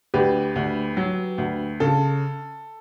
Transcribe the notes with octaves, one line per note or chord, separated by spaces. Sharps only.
D2 G4 B4
D2
F#3
D2
C#3 A4